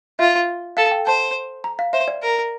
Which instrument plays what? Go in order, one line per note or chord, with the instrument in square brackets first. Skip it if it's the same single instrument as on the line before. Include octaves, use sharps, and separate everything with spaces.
[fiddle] F4 [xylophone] E5
[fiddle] A4 [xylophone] F5
[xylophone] G5
[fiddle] C5 [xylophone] A5
[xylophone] A#5
F5
[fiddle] C5 [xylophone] E5
[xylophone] D5
[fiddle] A#4